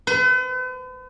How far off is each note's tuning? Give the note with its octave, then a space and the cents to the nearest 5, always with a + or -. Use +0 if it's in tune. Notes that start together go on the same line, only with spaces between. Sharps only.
B4 +45